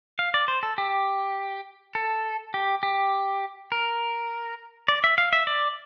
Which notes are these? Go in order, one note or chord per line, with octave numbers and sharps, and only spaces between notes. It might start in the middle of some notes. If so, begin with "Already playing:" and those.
F5
D5
C5
A4
G4
A4
G4
G4
A#4
D5
E5
F5
E5
D5